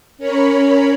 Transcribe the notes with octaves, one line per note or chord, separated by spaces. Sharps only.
C#4 A#4 C#5 B5